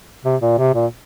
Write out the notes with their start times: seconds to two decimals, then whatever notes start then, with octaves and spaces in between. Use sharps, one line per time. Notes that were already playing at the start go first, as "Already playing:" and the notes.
0.24 C3
0.42 A#2
0.58 C3
0.74 A#2